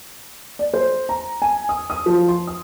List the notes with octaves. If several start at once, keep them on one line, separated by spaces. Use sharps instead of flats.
D5
C5
A#5
G#5
D#6
D#6
F3
C6
D#6